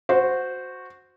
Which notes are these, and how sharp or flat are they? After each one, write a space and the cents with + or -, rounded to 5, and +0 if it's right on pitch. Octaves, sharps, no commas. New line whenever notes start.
F#4 -10 C5 -10